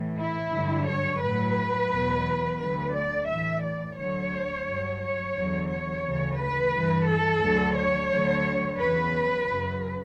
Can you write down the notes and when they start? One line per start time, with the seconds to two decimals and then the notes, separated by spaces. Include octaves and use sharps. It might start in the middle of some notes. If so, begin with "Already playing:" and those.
Already playing: A2 E3
0.17 E4
0.52 G2 D3 F#3
0.86 C#5
1.21 A2 F#3 B4
1.90 E2 B2 F#3
2.59 D2 D3 F#3 B4
2.93 D5
3.28 A2 E3 E5
3.62 D5
3.97 D2 D3 F#3 C#5
4.65 G2 F#3
5.00 C#5
5.35 E2 D3 F#3
5.69 C#5
6.03 D2 C#3 E3
6.38 B4
6.72 G2 E3
7.07 A4
7.41 D2 D3 F#3
7.76 C#5
8.10 D2 D3 F#3
8.79 E2 C#3 F#3 B4
9.48 F#2 C#3 F#3